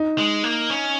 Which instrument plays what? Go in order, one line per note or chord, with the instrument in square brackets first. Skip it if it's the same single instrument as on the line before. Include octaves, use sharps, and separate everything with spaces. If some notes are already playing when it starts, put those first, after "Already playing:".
Already playing: [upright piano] D#4
[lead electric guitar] G#3
A#3
C#4